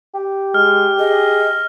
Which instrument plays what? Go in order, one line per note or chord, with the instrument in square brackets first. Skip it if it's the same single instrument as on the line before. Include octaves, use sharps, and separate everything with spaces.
[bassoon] G4
[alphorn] G#3 [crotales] F6
[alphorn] G#4 [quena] D#5